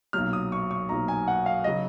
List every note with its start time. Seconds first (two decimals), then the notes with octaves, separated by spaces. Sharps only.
0.13 B1 A#2 F#3 F6
0.33 D#6
0.52 C#6
0.71 C#6
0.89 B1 A#2 F#3 A#5
1.08 G#5
1.28 F#5
1.46 F5
1.64 C#3 F#3 D#5